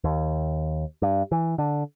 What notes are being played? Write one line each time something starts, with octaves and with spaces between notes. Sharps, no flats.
D#2
G2
E3
D3